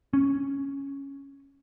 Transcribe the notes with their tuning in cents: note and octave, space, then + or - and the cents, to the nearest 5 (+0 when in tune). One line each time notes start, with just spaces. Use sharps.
C#4 +0